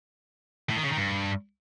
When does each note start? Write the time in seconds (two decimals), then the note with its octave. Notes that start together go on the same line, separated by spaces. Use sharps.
0.69 A2
0.76 D#3
0.83 C#3
0.90 D#3
0.97 G2